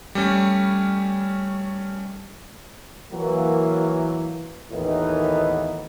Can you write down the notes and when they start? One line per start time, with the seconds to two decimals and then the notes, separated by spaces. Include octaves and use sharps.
0.15 G3 A3 C#4
3.12 E3 F#3 A#3
4.71 D#2 A2 D#3 E3 B3 D#4